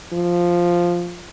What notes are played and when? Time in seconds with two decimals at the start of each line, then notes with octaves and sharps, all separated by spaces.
0.13 F3